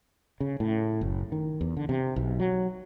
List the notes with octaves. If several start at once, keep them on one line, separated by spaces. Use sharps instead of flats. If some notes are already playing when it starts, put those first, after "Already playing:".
C#3
A2
F#1
D#3
E2
D3
C3
B1
F#3